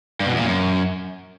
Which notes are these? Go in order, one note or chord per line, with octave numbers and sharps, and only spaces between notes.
G2
B2
E2
A#2
F#2